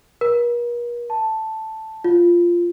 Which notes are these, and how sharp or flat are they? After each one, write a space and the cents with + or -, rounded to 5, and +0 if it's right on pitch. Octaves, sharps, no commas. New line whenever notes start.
A#4 +45
A5 +0
F4 -5